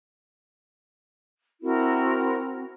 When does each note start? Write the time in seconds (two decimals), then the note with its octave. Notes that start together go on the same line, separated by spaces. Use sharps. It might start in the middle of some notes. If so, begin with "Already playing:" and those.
1.62 C4 E4 F#4 A#4